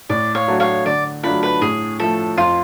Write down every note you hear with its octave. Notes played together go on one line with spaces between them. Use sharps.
A2 D5
C#5 F5
F#3 A3 D4 F#4
C#5 F5
D3 D5
F#3 A3 D4 F4 B4
B4
A2 G#4
F3 A3 A4
F2 F4